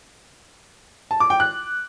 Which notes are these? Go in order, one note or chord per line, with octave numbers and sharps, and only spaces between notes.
A5
D6
G5
F#6